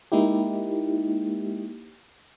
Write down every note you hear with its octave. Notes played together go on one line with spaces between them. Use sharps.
G#3 A#3 D#4 E4 G4